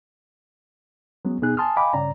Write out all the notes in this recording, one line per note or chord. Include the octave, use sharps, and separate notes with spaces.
F#3 G#3 B3 C#4
B2 B3 D#4 G#4 F#6
G#5 A5 C6 D#6 F6
D#5 F5 G5 G#5 B5 D6
G2 C#3 C#4 D5 A#5